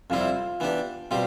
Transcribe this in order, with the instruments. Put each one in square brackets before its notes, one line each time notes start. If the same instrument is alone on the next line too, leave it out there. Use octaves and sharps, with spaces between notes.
[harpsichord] F2 C3 G3 C4 E4 [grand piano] F4
[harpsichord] E3 B3 D4 G4
[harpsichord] B2 G3 C4 G4 [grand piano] F4